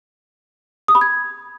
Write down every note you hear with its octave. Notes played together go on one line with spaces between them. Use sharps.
D#6
B5
G#6